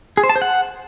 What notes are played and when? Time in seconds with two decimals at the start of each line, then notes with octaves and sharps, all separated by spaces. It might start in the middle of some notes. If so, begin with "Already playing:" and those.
0.17 G#4
0.23 C5
0.30 A5
0.36 C5
0.42 F#5